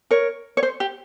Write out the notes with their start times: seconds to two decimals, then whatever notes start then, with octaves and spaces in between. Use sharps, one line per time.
0.11 A#4 C#5
0.57 C#5
0.63 C5
0.80 G4